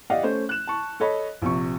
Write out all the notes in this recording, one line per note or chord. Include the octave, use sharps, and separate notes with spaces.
G4 D5 D#5 F5 F#5
A3 C#4 C5
F#6 E7
A5 C#6
A4 C#5 D#5 B5
A#1 C3 C#6